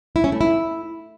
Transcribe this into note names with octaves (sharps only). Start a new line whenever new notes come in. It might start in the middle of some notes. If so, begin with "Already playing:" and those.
E4
C#4
A3
E4